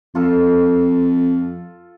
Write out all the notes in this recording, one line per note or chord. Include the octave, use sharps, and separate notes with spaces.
F2 F4 A4